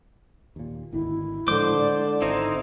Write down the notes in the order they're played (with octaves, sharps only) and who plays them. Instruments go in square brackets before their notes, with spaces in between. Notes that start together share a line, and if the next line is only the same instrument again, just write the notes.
[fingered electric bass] D#2 A#2
[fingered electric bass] G#1 D2 D#3 [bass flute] E4
[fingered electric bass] A2 F3 G#3 [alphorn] D3 [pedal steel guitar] C5 D6
[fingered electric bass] G#3 [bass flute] D5
[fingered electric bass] G#1 [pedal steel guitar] C4 D#4 E4 [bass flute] C5